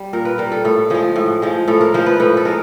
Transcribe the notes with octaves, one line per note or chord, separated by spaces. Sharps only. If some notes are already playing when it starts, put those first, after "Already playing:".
Already playing: G3
A#2 A#4
B4
G3 A#4
A4
A2 A4
F3 G#3 G#4
A2
F3 G#3
A2 A4
A#4
F3 G#3 C5
B4
A2 B4
A4
G#3 A#4